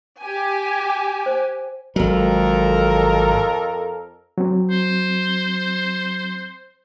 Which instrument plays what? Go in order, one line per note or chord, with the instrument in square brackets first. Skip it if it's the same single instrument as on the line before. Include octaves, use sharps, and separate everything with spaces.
[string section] G4 G#5
[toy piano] C5
[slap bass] G#1 F#3 [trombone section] F2 A4 A#4
[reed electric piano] F#3 C4
[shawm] C5